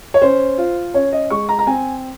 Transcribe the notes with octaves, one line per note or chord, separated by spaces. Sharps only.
C#5
C#4 C5
F4
C#4 C#5
D#5
G#3 C#6
A#5
A#5
C4 G#5